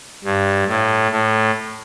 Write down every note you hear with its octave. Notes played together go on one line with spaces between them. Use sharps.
G2
A2
A2